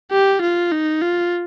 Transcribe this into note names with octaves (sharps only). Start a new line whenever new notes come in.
G4
F4
D#4
F4